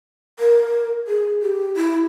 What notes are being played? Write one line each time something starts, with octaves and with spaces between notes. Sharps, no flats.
A#4
G#4
G4
E4